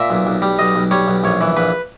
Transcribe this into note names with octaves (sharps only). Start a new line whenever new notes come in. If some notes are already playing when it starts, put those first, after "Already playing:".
Already playing: A#2 E5
B1
B1
G3
B1 D#5
B1
G3 C#5
B1
A#1 C#5
E3
A#1 B4